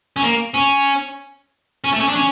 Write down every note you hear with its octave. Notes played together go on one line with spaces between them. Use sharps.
C#4
A#3
C#4
C#4
A3
C#4
D4
C#4